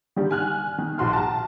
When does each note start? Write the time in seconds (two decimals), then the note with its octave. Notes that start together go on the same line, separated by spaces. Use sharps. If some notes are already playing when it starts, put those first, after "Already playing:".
0.16 D3 D#3 G3
0.31 G#5 F6 F#6
0.78 D#3
0.98 A#1 F#4 C6 F6
1.13 A5 A#5